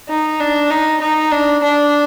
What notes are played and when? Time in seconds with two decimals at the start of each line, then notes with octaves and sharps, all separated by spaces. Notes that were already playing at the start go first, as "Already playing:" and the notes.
0.09 D#4
0.40 D4
0.70 D#4
1.01 D#4
1.31 D4
1.62 D4